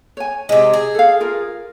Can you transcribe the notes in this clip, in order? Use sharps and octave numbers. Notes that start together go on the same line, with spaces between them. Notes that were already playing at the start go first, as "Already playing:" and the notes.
C#5 G#5
C3 G#3 E4
G#4
A4 F5
F4 A#4